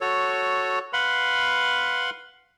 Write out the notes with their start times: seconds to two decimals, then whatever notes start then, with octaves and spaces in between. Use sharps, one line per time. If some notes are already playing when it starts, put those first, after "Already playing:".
0.01 F#4 A4 C#5
0.93 B4 F5 F#5 B5 C6